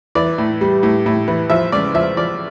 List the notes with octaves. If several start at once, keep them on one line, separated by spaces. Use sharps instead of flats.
E3 D5
A2
G3
A2
A2
E3
F3 E5
C#2 D5
F3 E5
F3 D5